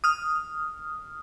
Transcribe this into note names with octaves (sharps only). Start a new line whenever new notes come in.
D#6 F6